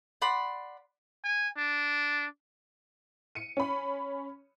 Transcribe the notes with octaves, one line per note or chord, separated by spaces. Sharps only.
D5 F#5 B5 C6
G#5
D4
C#7 D#7
C#4 B5